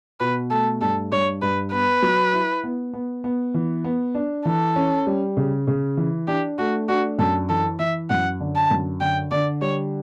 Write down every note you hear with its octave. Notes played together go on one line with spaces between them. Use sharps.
B2 B4
A3 A4
G2 A4
G2 C#5
G2 B4
B3 B4
F#3
E4
B3
B3
B3
E3
B3
D4
E3 A4
C#4
G3
C#3
C#3
E3
D4 G4
A3 F#4
D4 F#4
F#2 A4
E3 A4
E3 E5
F#2 F#5
D3
A5
F#2
D3 G5
D3 D5
G3 C#5